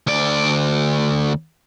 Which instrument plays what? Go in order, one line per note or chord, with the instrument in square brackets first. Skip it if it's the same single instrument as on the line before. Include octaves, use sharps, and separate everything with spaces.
[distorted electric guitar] D2 D5